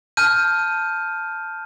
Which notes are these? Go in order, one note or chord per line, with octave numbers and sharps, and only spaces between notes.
A5 F6 G6 D#7